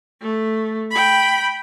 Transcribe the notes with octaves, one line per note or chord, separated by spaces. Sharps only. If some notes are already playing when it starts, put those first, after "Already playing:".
A3
G5 B5